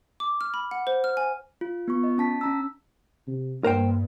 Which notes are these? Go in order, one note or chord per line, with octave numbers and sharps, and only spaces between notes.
D6
F6
B5
F#5
C5
F6
G#5
F4
B3 F4 C#6
D#5
C#4 A5 B6
C#4 A#5 E6
C3
G2 A#3 A#4 C5 G5